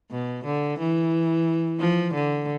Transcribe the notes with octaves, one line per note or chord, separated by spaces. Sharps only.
B2
D3
E3
F3
D3